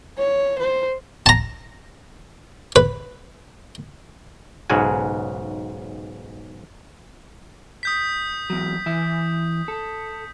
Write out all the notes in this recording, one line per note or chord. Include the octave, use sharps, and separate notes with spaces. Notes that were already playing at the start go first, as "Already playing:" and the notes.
C#5
C5
A5 A#5
B4
B1 G#2 C#3 F#4 G#5
D#6 G6 B6
E2 F#3
E3 E5
A4